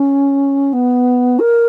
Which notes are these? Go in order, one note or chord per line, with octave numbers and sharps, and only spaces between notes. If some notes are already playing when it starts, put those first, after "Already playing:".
Already playing: C#4
B3
A#4